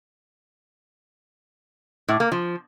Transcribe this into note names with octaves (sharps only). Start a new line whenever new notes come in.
A2
A#3
F3